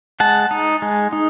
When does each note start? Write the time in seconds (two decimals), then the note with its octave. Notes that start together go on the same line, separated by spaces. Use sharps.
0.20 G#3 F#5 A5
0.51 D#4
0.82 G#3
1.13 D#4